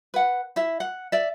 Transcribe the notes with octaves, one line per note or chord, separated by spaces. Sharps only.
B4 F#5
E4 E5
F#5
D5 E5